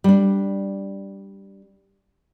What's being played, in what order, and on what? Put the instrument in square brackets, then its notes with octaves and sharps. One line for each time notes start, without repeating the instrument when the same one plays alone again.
[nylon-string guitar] G3 D4